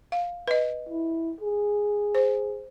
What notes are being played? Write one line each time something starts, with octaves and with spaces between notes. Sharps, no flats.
F5
B4 D#5
E4
G#4
C5